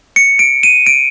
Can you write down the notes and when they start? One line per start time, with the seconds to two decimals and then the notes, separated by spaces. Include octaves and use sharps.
0.16 C#7
0.39 D7
0.63 D#7
0.86 D7